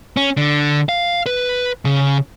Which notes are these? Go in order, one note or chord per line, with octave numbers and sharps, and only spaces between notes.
C#4
D3
F5
B4
C#3